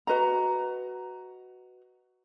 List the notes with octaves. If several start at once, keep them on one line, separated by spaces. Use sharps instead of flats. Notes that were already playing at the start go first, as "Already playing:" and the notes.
F#4 B4 D#5 A#5